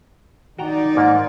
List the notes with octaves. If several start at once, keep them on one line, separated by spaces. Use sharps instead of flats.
D#3 D#4 F#4 D5 G5 A#5
G#2 A#3